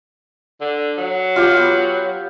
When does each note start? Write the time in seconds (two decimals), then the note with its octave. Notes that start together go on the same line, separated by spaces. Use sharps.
0.61 D3
0.98 F#3
1.36 F4 G4 F5
1.57 B3